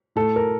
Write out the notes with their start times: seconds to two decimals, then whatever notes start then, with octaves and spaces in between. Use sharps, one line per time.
0.16 A2 A4
0.36 A#4